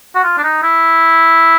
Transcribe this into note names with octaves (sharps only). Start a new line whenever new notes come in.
F#4
F4
D4
D#4
E4